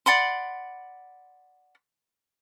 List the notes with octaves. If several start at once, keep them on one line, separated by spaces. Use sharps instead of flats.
D5 F#5 B5 C6